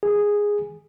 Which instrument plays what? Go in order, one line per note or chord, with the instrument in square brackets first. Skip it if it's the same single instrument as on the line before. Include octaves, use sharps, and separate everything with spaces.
[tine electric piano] G#4